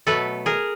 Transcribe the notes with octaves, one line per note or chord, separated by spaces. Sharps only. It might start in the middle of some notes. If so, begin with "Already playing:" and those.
B2 F#3 A3 A4 B4
G#4 A#4